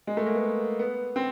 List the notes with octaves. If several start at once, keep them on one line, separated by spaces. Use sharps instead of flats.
G#3
A3
A#3
B3
B3
C4